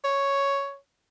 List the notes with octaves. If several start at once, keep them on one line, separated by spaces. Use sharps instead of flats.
C#5